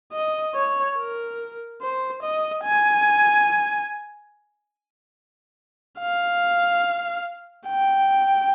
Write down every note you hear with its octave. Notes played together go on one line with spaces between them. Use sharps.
D#5
C#5
A#4
C5
D#5
G#5
F5
G5